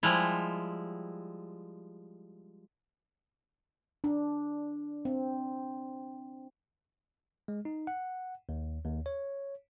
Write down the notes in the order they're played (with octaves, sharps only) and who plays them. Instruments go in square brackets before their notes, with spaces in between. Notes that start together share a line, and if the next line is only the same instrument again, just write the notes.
[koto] F3 G3 G#3 E4
[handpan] D4
C4
[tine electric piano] G#3
D#4
F#5
D#2
D#2
C#5